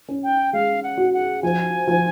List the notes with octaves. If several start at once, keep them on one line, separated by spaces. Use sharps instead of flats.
C#4
G5
G#3 F5
F#5
F#4
F#5
F3 G#5
F3